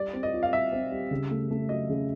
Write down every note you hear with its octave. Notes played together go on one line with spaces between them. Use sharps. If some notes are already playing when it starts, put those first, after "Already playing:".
Already playing: G3 D5
C4
D#5
F4
F5
G3 E5
C4
G3
C#3
A3
A3
F#3 D#5
C#3